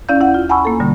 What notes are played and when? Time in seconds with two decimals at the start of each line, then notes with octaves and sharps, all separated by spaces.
0.09 C#4 E4 D5 F5 G6
0.20 D#2 E4 F#5
0.34 F4
0.49 F#5 G#5 A5 B5 C#6 E6
0.65 A#3 A4
0.80 B2 D3 G3